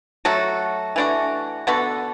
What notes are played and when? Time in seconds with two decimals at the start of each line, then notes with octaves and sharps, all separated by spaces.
0.25 F#3 A3 F#4 A4
0.96 E3 A3 D4 F#4
1.67 D3 B3 F#4 A4